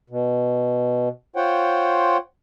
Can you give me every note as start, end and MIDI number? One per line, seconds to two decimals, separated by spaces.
0.10 1.09 47
1.36 2.17 65
1.36 2.17 72
1.36 2.17 73
1.36 2.17 78
1.36 2.17 79